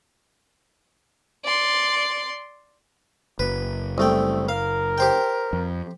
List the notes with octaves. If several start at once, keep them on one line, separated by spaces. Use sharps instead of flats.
D5 C6
F#1 B4
C2 A3 G5
A#4 F5
G4 C5 G5
F2